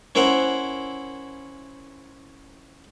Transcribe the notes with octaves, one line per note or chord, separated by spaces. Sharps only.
C#4 E4 A#4 C5 F#5